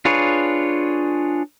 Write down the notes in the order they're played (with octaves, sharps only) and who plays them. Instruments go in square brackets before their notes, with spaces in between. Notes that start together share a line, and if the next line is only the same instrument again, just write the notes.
[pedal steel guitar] D4 F4 G#4 B4 C#5